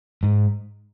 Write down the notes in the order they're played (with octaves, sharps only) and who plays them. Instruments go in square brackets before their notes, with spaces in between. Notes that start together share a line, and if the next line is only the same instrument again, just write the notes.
[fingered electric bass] G#2